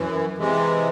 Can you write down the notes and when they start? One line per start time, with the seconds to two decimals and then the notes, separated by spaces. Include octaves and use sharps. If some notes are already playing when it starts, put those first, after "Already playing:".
Already playing: F#2 E3
0.38 C3 E3 G#3